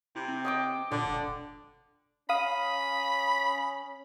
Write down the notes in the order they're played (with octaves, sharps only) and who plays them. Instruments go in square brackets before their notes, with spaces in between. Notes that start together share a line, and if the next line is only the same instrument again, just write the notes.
[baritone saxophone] C3 [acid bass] E4
[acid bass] C4
[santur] D#5 G5 D6
[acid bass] A#2 [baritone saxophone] D3 [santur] D5
[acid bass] E1
[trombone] C#4 [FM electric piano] F5 D#6 [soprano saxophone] B5